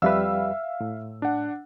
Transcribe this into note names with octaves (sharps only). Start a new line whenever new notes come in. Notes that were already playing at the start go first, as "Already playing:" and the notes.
F2 G3 B4 E5 F5 E6
A2
D4 F#5